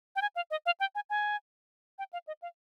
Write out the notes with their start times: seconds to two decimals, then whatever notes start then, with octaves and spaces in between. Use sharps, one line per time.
0.16 G5
0.22 G#5
0.36 F5
0.51 D#5
0.66 F5
0.80 G5
0.95 G#5
1.10 G#5
1.99 G5
2.13 F5
2.27 D#5
2.42 F5